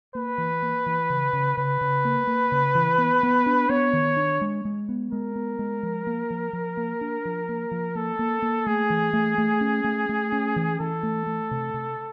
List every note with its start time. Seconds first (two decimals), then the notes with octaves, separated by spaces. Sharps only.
0.15 A#3 B4
0.38 E3
0.62 A#3
0.86 E3
1.10 C#3
1.33 C#3
1.57 C#3 B4
1.81 C#3
2.05 A#3
2.27 A#3
2.52 C#3
2.75 E3
2.98 B3
3.23 B3
3.46 D4
3.69 B3 C#5
3.93 D#3
4.16 D4
4.41 G#3
4.65 G#3
4.89 B3
5.12 G#3 A#4
5.36 B3
5.59 G#3
5.83 F3
6.07 A#3
6.30 F3
6.53 F3
6.77 A#3
7.01 D4
7.25 F3
7.49 A#3
7.71 F3
7.95 A#3 A4
8.19 A#3
8.42 A#3
8.66 A3 G#4
8.90 E3
9.13 A3
9.38 A3
9.61 C#4
9.84 A3
10.09 A3
10.32 C#4
10.56 E3
10.79 E3 A4
11.03 A3
11.27 A3
11.51 C3
11.74 C3